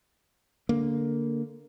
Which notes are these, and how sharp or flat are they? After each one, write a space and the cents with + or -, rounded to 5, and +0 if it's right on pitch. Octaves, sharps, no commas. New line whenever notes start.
D3 -15 A#3 +0